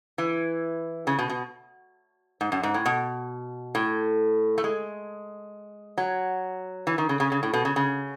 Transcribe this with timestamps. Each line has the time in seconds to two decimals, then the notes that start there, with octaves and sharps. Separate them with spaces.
0.18 E3
1.07 C#3
1.19 B2
1.30 B2
2.41 G#2
2.52 F#2
2.63 G#2
2.74 A2
2.86 B2
3.75 A2
4.58 A3
4.64 G#3
5.98 F#3
6.87 E3
6.98 D#3
7.09 C#3
7.20 C#3
7.32 C#3
7.43 A2
7.53 B2
7.65 C#3
7.76 C#3